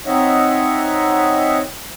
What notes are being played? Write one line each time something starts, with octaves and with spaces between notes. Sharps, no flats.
C4 D#4 C#5 D#5 E5 F#5